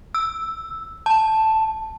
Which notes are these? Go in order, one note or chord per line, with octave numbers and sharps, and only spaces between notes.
E6
A5